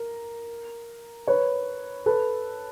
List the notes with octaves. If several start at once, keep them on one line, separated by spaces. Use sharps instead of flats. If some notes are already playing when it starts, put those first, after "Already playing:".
Already playing: A#4
B4 C#5
A4 B4